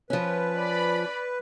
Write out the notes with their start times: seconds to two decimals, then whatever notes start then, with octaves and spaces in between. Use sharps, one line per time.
0.10 F3 C#4 B4
0.56 D5 B5